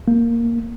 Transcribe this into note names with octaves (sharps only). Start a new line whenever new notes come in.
A#3